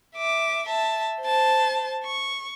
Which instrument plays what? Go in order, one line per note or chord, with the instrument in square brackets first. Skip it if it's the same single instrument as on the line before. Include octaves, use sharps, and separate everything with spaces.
[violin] E5 D6
E5 A5
C5 A5
C#6